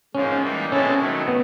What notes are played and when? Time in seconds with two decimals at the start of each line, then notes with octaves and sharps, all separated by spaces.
0.15 G#2 F3 A#3 C#4
0.43 E3 G3 A#3 D#4
0.71 B2 G#3 C4 C#4 E4 A4
1.00 D#3 F#3 A3
1.28 B3